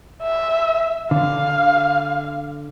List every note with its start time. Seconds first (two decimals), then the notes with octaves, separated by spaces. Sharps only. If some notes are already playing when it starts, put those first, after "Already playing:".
0.22 E5
1.11 D3 F5